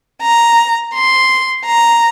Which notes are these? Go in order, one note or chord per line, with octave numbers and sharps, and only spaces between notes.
A#5
C6
A#5